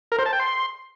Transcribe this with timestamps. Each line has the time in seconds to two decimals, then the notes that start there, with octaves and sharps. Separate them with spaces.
0.12 A#4
0.19 C5
0.26 A5
0.33 G5
0.40 C6